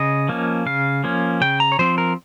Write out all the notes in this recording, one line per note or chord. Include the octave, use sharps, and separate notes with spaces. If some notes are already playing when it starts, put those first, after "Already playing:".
Already playing: C#3 D#5
F3 A#3 C#4
C#3 F5
F3 A#3 C#4
C#3 G5
A#5
C#5
F3 C4 C5
A#4